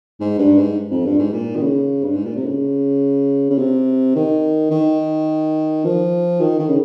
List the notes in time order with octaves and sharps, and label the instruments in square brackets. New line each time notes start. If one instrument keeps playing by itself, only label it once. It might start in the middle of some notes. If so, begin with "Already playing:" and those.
[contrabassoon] G#2
G2
G#2
F2
G2
G#2
A#2
D#3
C#3
G2
G#2
A#2
C3
C#3
C#3
C3
D#3
D#3
F3
D#3
D#3
C#3